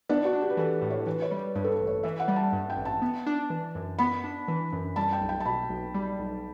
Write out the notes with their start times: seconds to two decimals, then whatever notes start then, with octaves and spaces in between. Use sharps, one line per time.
0.09 B3 D4
0.25 F#4
0.33 D4
0.42 G4
0.50 B4
0.57 E3 A4
0.81 A2
0.90 C#5
1.07 E3 B4
1.22 C#5
1.31 G3
1.39 B4
1.55 G2 B4
1.64 A4
1.72 B4
1.80 A1
1.87 C#5
2.03 E3 E5
2.20 F#5
2.28 G3
2.36 A5
2.52 G2
2.70 G5
2.77 A1
2.85 A5
3.02 B3
3.26 D4
3.50 E3
3.75 F#2
3.99 B3 B5
4.24 D4
4.48 E3
4.72 F#2
4.96 G3 A5
5.13 G5
5.22 B1
5.29 G5
5.40 A5
5.45 B2 B5
5.69 B1
5.94 G3
6.19 B1